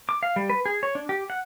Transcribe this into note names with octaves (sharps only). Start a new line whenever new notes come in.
D6
F5
G3
B4
G#4
C#5
D4
G4
F#5